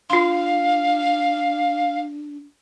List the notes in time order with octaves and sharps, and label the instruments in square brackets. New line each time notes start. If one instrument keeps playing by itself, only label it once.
[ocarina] D4 [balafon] F4 C6 [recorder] F5